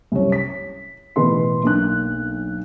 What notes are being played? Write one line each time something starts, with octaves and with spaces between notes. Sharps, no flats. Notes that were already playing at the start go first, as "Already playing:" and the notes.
C2 F#2 C#5
B6
A1 B2 E3 B4 C6
B1 A#3 D4 F#6